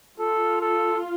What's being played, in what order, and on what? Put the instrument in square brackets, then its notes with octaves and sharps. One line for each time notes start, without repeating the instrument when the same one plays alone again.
[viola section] F4 [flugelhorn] A4
[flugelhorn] A4